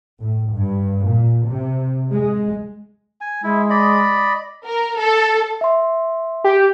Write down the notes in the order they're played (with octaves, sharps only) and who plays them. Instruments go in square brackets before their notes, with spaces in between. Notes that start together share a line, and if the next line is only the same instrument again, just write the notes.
[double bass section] A2
G2
A#2
C3
G#3
[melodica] G#5
[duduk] G#3 [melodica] E4
[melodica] D5 D#5 B5
[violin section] A#4
A4
[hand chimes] E5 C6
[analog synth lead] G4